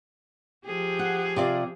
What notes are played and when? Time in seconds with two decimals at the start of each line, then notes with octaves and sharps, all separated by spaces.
0.65 F3 G4 G#4
0.99 F#5
1.36 C3 F4 D5